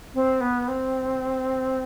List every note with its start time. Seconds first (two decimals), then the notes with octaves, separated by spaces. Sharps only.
0.14 C4
0.41 B3
0.68 C4